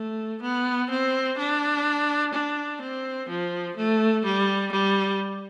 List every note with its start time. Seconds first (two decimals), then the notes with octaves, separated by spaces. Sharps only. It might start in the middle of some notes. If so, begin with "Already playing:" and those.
Already playing: A3
0.42 B3
0.90 C4
1.38 D4
2.33 D4
2.81 C4
3.29 F3
3.76 A3
4.25 G3
4.72 G3